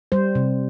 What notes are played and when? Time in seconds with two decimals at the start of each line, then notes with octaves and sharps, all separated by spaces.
0.12 G3 C5
0.35 C3